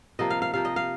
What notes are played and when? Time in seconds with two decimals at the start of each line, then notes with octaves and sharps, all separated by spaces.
0.19 C3 F3 A#3 D#5
0.30 F5
0.42 F5
0.53 C3 F3 A#3 F5
0.65 D#5
0.76 F5